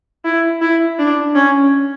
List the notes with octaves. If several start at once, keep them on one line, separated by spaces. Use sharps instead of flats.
E4
E4
D4
C#4